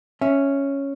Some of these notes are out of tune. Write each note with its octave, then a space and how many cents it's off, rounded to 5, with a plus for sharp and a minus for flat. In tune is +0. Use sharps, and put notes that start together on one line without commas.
C#4 +0 E5 +0